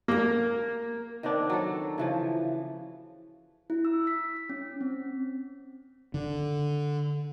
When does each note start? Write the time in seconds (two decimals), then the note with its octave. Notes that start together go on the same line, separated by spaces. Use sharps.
0.08 A#3 A#4 A#5
1.23 D#3 B3 C4 D4
1.50 F#3 A4
1.98 C#3 E3 F3
3.70 E4
3.85 E6
4.07 B6
4.37 B6
4.50 C#4
4.81 C4
6.14 D3